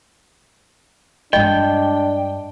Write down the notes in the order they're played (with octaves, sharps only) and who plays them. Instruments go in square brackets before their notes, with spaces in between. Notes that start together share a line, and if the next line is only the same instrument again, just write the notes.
[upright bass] G2 G#3 [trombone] D4 [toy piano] D#5 [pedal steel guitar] G5